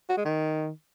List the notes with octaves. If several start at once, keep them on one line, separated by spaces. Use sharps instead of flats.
F#4
G#3
D#3